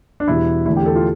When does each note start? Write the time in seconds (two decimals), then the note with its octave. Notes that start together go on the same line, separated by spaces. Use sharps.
0.20 D4
0.28 E2 B2 G3 E4
0.66 E2 D3 A3 E4
0.77 G4
0.86 A4
0.96 F4